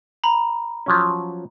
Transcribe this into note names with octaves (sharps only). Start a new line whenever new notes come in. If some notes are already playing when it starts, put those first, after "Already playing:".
A#5 B5
F3 F#3 C#4